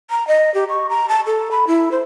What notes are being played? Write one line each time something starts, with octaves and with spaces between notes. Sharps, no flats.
A#5
D#5
G4
C#6
A#5
A5
A4
B5
E4
C5